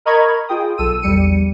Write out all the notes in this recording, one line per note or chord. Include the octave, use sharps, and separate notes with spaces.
A#4 D#5 A#5 B5 C#6 G#6
F4 G#4 G5 D#6
B1 A4 E6 D#7
A#1 E2 G3 C#7 D#7